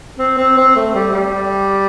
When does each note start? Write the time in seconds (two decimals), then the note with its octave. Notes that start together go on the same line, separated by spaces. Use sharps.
0.19 C4
0.38 C4
0.57 C4
0.76 A3
0.95 G3
1.13 G3